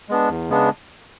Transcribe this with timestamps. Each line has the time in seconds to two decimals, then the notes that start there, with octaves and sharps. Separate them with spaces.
0.09 G#3 B3 D4
0.29 E2
0.49 C#3 G#3 B3 D4